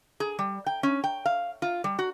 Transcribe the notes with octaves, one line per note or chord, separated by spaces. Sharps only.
G#4
G3
G5
C#4
G5
F5
F4
G3
F#4